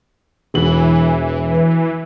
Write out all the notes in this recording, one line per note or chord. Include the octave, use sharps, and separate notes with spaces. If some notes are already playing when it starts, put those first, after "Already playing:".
E1 E3 F#4 F#7